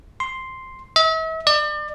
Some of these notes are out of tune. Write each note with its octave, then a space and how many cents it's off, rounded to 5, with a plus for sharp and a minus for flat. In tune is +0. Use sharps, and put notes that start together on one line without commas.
C6 +0
E5 -40
D5 +35